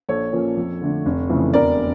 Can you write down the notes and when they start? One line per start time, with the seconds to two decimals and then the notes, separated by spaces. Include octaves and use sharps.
0.09 A#1 A4 C#5
0.32 A#2 F3 A#3 C#4
0.57 F2
0.81 D3 A3 D4
1.06 F1
1.30 F2 C#3 E3 A3
1.54 E1 A#4 D5